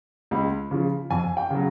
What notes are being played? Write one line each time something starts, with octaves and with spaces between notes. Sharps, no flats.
C#2
C#3 F3
F2 G#5
G5
C#3 F#3